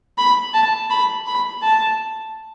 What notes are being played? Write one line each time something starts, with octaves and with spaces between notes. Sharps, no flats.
B5
A5
B5
B5
A5